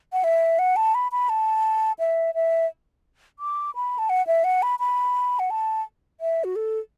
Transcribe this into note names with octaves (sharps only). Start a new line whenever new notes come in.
F#5
E5
F#5
A5
B5
B5
A5
E5
E5
D6
B5
A5
F#5
E5
F#5
B5
B5
F#5
A5
E5
F#4
A4